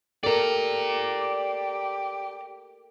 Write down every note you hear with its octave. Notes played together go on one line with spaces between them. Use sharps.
G4 A4 A#4 D5 A#5